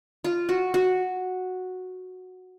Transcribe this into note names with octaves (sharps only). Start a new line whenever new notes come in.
F4
F#4
F#4